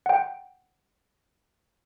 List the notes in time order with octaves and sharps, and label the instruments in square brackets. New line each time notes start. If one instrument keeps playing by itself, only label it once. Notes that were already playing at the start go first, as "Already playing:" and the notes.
[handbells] F#5 G5